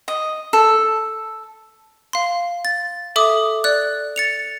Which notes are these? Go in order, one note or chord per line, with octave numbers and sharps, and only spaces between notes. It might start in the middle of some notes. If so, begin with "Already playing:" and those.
D#5
A4
F5 C6
A6
A4 E5 D6 D#6
D5 F#6
A6 C#7 F7